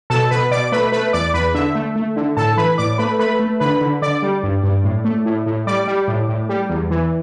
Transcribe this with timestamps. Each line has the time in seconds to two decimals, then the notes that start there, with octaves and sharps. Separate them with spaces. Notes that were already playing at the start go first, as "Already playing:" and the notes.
0.10 B2 A4 A5
0.31 B2 B4 B5
0.51 B2 D5 D6
0.72 A3 B4 B5
0.92 A3 B4 B5
1.13 E2 D5 D6
1.34 E2 B4 B5
1.54 D3 E5
1.75 A3
1.96 A3
2.16 D3
2.37 A2 A4 A5
2.57 E3 B4 B5
2.78 A2 D5 D6
2.98 A3 B4 B5
3.19 A3 B4 B5
3.40 A3
3.60 D3 B4 B5
3.81 D3
4.02 D3 D5 D6
4.22 G3
4.43 G2
4.64 G2
4.84 A2
5.05 A3
5.26 A2
5.46 A2
5.67 G3 D5 D6
5.87 G3
6.08 A2
6.28 A2
6.49 G3
6.70 E2
6.91 E3